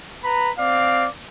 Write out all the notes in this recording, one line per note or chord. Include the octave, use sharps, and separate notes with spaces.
B4 A#5 B5
C4 D5 F5